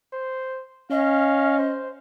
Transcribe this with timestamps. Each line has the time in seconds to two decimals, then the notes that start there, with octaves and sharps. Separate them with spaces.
0.12 C5
0.91 C#4 D#5 F5
1.58 C5